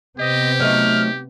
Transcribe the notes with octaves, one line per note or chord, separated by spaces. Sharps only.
C3 B3 C4 G4 D#5
F#3 A3 D#4 F6